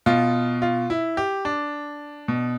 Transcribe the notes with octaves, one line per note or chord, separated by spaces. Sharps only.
B2 F4
F4
E4
G4
D4
B2